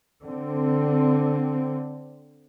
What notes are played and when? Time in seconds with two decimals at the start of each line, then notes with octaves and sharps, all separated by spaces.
0.23 D3 C4